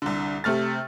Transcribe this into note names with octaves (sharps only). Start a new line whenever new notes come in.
C2 D3
C3 A3 F6 A6